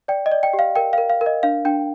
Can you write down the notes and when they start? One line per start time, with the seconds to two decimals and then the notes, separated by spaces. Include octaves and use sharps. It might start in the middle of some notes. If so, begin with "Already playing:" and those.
0.08 D5 G5
0.26 D#5
0.32 D5
0.43 G5
0.53 G4
0.59 F5
0.76 A#4 G5
0.93 A#4 F5
1.10 F5
1.21 A#4
1.26 D#5
1.43 D4 F5
1.65 D4 G5